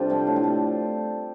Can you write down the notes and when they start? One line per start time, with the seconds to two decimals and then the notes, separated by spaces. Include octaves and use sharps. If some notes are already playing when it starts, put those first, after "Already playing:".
Already playing: C3 G3 D4 F4 G4 A4
0.10 F3 C4
0.27 A2
0.36 D4
0.44 A3